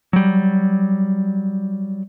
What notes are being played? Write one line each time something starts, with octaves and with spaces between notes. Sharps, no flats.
F#3 G3